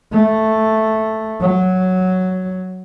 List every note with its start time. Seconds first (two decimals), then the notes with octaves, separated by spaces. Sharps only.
0.13 A3
1.41 F#3